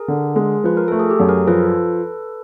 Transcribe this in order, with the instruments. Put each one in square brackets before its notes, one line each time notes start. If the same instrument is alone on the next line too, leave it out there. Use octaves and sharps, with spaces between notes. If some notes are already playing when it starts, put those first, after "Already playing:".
Already playing: [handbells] G#4 A#4
[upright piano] D3
G#3
[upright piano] F3 [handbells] B4
[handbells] A#4
[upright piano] A3 [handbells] A4
[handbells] G#4
G4
[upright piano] F#2
[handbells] G#4 A#4
[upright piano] F3 [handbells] A4 B4